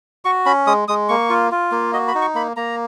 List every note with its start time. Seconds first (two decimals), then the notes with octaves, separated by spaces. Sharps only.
0.25 F#4 C#6
0.46 C#4 B5
0.67 G#3 D#6
0.88 G#3 D#6
1.09 A#3 C#6
1.29 F4
1.51 F4
1.72 A#3
1.93 F#4 D#5
2.08 B5
2.15 D#4
2.21 C#6
2.35 A#3 B5
2.57 A#3 A#5